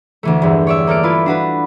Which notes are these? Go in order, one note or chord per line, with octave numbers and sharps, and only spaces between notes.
D2 E3 A3
G1 E2
C#5 D5 E5
A#3 A4 F6 D7
E4 F4 B4
D4 F#4 B4